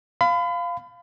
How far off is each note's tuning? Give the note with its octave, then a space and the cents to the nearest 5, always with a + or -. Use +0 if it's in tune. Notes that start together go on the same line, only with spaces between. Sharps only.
F5 +0 B5 +35